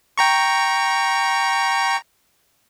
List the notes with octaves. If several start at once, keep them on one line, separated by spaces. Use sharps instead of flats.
G5 A#5 C#6